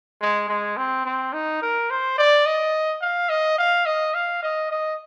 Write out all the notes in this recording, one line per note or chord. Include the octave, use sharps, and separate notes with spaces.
G#3
G#3
C4
C4
D#4
A#4
C5
D5
D#5
F5
D#5
F5
D#5
F5
D#5
D#5